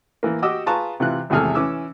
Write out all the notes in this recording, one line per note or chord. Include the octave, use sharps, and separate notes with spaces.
E3 A#3
F#4 G4 D#5 D6 E6
F4 G#4 B4 A5 A#5 C#6
C3 E3 F4 F#6
G#1 E2 C3 G#4 A4 F6
E3 C#4 D6 E6